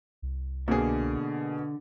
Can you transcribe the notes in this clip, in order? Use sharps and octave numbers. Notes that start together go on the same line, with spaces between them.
C2
B2 D3 A#3 G#4